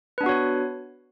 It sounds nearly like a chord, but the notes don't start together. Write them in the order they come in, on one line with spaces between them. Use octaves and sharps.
B4 D4 B3 F#4 C#5